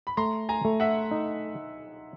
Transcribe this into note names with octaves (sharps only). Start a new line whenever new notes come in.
B5
A3 A#5 C6
G#5 A#5
A3
E5 F#5
D#4